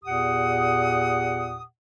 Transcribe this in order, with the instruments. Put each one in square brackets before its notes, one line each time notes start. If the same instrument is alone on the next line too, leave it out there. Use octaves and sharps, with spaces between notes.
[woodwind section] E2 A#2 G4 F#5 D#6